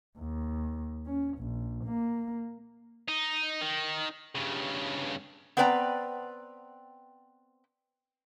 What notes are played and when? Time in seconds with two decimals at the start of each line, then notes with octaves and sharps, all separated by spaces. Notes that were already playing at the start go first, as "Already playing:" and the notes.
0.18 D#2
1.06 C#4
1.38 A#1
1.85 A#3
3.08 D#4
3.62 D#3
4.35 G2 C#3
5.57 B3 C4 B4 D5 G5 A#5